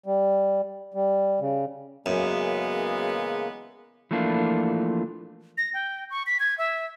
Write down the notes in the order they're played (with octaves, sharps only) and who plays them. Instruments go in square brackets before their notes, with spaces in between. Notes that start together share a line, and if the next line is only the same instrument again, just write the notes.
[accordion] G3
G3
C#3
[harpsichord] F#2 [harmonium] C#3 A#3 [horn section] E3 G#3 B3
[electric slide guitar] E3 F3 A3 A#3 D4 F4
[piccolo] A#6
G5
C#6
B6
G#6
E5